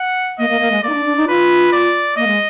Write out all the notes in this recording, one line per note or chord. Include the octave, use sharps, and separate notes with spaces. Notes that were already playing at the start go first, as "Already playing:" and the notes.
Already playing: F#5
A#3 D#5
A#3
A#3
G#3
A#3 D5
D#4
D4
D4
D#4
F4 B4
D5
A#3 D#5
G#3